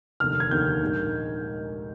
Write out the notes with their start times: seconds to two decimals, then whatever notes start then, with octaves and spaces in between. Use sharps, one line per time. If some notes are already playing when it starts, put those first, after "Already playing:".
0.20 F1 D#2 D3 F6
0.40 G#6
0.51 F1 D#2 D3 G6
0.82 A#1 G#2 D#3